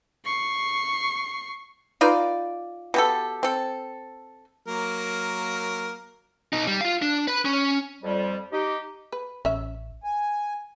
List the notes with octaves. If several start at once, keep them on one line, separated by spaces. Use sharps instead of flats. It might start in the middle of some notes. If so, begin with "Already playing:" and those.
C#6 C7
D#4 F4 B4 D5
B2 G4 A4
C4 A4
F#3 A#3 A#4
B2 D#4
G3
F4 F5
D4
B4 B5
C#4
F2 G3
D#4 G4
B4
A1 C#4 E5
G#5